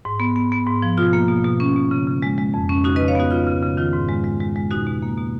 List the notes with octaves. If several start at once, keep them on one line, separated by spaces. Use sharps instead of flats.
G#2
B3
B3
B3
G#2
F3
B2 F4
A#3
B2
B2
C#4
B2
C#3
C#3
G#3
G#3
F2
C#4
C#3 D#4 F#4
C#3 B4 D#5
C#5 F5
B3 D#4 F#4
C#3 F4
C#3
C#3
D#3 F4
G#2
G#3
G#3
G#3
G#3
B2 D#4 F#4
B2
A#3
B2